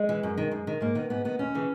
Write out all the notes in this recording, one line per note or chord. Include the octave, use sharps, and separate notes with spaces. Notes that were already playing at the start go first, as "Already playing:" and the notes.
Already playing: G#3
E3
F#2
D#3
F#2
D#3
G#2 A#3
D#3 B3
G#2 B3
D#3 B3
D#2 C#4
C#3 E3